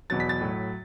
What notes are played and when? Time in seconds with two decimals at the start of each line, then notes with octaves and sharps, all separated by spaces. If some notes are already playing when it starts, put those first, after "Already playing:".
0.10 E2 B2 F#3 A6
0.20 B6
0.29 A6
0.41 A2 F#3